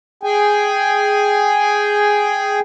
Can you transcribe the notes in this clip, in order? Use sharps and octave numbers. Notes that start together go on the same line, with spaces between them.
G#4 G5 G#5